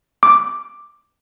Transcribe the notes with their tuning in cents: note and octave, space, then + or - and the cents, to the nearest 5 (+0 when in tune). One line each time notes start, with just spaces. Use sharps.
D6 +5